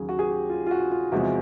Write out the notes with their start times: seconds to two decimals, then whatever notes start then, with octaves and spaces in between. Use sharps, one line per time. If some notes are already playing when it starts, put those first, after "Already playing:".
Already playing: D#2 C#3 F#3 G#4
0.09 F#4
0.19 G#4
0.29 G4
0.50 F4
0.66 F4
0.71 F#4
0.91 F4
1.12 E2 C3 F3 G#3 F#4